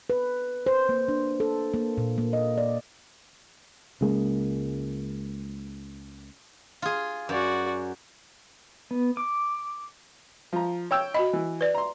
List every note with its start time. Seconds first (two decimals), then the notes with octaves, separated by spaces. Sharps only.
0.10 B4
0.67 C5
0.89 A#3
1.09 D4
1.40 A4
1.74 A#3
1.98 A#2
2.18 A#3
2.33 D#5
2.58 D5
4.01 C#2 C#3 G#3 A#3
6.82 F4 G#4
7.29 F#2 F#4 D5
8.91 B3
9.17 D6
10.53 F3 A#5
10.91 C#5 G5 E6
11.14 F#4 D#5 B5
11.33 E3
11.61 B4 D5
11.74 A#5 C6